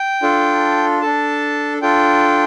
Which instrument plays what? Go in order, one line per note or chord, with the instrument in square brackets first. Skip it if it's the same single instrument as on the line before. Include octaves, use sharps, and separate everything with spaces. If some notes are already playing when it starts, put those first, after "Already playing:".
Already playing: [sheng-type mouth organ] G5
D4 F4 A4
D4 A4 A5
D4 F4 A4 G5